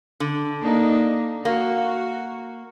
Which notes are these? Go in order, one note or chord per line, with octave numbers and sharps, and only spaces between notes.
D3
A#3 D4 D#4
A#3 F#4